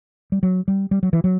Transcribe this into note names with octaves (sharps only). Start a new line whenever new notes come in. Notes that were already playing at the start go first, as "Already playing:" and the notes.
G3
F#3
G3
G3
F#3
E3
F#3